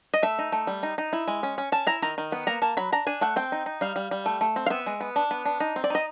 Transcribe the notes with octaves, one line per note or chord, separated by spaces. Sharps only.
D#5
A3 E5
D#4
A3
G3
D#4
D#4
E4
G#3
C#4
C#4
C#4 A5
E4 A#5
D#3 A#5
D#3
B3
A#3 A#5
A#3 A5
F#3 B5
D4 A#5
D4 G#5
A3 F#5
C4 G5
D#4
D#4
G3 F5
G3
G3
A3
A3
C4
F5
B3 E5
G#3
B3
D4
B3
D4
D#4
C4
D5
D#4 D#5